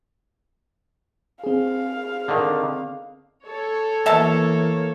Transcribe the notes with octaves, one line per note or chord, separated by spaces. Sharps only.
C4 G#4 F5
D3 D#3
A4 C#5
B2 E3 A#3 E5 A5